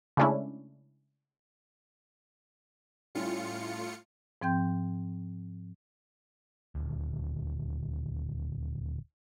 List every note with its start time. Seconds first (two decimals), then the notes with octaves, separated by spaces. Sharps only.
0.17 C#3 G#3 A3 C#4 D4 E4
3.15 A2 G3 C#4 E4 F4 C#7
4.42 G#2 F3 C4 G5 G6
6.75 D#1 D2